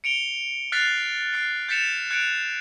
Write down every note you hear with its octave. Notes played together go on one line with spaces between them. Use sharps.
C#7 D7 F7 G7
F6 F#6 A6 B6 C7 F7
F6 C7 D7
G6 A6 B6 C#7 E7 F7
F#6 G#6 C#7 D7 F7